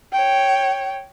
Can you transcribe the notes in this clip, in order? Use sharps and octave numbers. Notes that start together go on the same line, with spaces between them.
C#5 G5